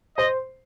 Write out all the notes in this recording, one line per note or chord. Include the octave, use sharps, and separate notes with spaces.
C5 D#5